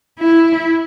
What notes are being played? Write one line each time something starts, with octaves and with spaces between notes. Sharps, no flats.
E4